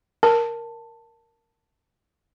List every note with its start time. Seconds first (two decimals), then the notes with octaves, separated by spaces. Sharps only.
0.23 A#4 A5